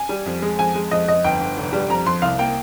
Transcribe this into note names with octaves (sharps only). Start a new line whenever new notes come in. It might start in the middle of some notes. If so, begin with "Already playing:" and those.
Already playing: G#5
G3
F2
G#3
F2 G#5
G#3
F2 D#5
F2 D#5
G1 G5
G1
F1
G3
F2 A#5
F2 C6
C2 F5
A#3 G5